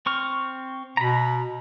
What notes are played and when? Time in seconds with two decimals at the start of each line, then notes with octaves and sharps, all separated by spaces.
0.06 C4 C#6 F6
0.97 B2 A#5 B5